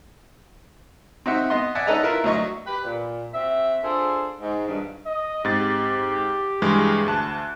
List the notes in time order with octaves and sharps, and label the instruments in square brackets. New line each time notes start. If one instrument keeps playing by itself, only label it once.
[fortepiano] C4 D#4 F#4 E5 F#5
B3 D#5 C6
D5 E5 F#5 G#5
C#4 D#4 A4 B4 D#5 A#5
E4 F4 A#4 B4 E5
D2 F#3 D#5 C#6
[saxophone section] G4 B4
A#2
C4 F#4 E5
D4 F4 G#4 A4 C5
G#2
G2 A#2 D#3
[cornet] D#5
[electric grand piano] G#2 C4 A6 [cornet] G4
[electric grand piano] G2 E3 G#3
D2 A5 F#6